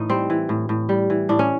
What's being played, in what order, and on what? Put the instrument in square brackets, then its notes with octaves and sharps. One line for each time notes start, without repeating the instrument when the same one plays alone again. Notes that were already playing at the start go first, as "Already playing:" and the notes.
Already playing: [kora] A2 E3 D#4
G3 C4
E3
A2
A2
G3
E3
A2 D4
C#4